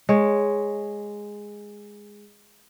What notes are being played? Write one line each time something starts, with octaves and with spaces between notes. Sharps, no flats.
G#3 C#5